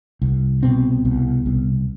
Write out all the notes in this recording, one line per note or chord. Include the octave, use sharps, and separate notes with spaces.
C2
B2 C4
C2
C2